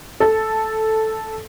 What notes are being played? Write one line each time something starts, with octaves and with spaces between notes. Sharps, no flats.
A4